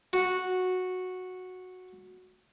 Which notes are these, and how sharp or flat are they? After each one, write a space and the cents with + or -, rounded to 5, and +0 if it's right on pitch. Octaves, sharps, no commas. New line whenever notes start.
F#4 -10